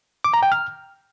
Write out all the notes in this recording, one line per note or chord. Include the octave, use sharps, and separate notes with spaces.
D6
A#5
G5
F6